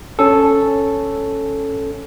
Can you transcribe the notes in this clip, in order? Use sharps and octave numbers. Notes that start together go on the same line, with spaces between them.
C#4 A4